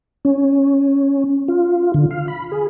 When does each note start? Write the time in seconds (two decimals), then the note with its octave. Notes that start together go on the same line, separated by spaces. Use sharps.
0.25 C#4
1.48 F4
1.94 D3
2.11 F5
2.28 B5
2.52 G#4